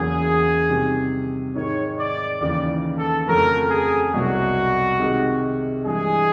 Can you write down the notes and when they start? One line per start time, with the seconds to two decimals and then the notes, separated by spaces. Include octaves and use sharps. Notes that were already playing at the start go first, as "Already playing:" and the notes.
Already playing: E2 C#3 F#3 A#3 C#4 G#4
0.69 C3 D#3 G3
1.55 G#2 D#3 G#3 C#5
1.98 D5
2.41 D#2 C#3 E3 D5
2.98 A4
3.27 F2 C#3 F#3 A3 C#4 A#4
3.70 G#4
4.13 C2 B2 F#3 F#4
4.99 C3 D#3 G#3
5.85 G2 E3 G#3 G#4